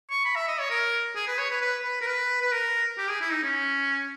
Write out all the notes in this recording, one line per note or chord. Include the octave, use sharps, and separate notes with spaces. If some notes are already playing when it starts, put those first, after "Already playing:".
C#6
B5
E5
D#5
C#5
A#4
G#4
B4
C#5
B4
B4
B4
A#4
B4
B4
A#4
G4
G#4
E4
D#4
C#4